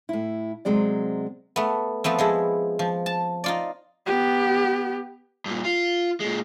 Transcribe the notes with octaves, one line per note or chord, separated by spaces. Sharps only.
A2 E4
C3 F#3 G#3 C4 D5
A3 B3
F3 A3 B3 C4
F3 G#3 E4
F3
A5
D#4 F4 D5
B3 G4
G2 A#2
F4
A#2 G#3